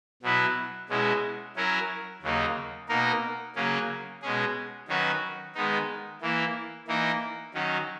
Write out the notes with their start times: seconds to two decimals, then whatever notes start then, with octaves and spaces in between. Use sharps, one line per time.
0.23 B2 F#3 B3 E4 B4
0.89 B2 G#3 C#4 E4
1.56 F#3 C#4 E4 A#4
2.22 D#2 C#3 F#3 A#3 D#4
2.89 B2 A#3 D#4 A#4
3.56 C#3 F#3 A#3 C#4
4.22 B2 G#3 C#4 G#4
4.88 D#3 F#3 C#4 F#4 B4
5.55 D#3 G#3 B3 D#4
6.21 E3 A#3 E4
6.88 E3 A#3 D#4 A#4
7.54 D#3 F#3 C#4